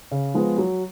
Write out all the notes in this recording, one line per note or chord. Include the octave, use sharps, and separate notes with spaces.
C#3
F3 G#3 B3
F#3